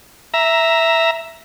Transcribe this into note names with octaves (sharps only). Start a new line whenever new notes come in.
E5 A#5